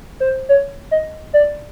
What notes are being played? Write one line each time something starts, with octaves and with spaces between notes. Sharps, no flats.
C5
C#5
D#5
D5